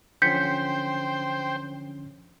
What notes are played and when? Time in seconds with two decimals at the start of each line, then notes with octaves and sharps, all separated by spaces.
0.22 D3 F3 C#4 C5 G5 G6 B6 C#7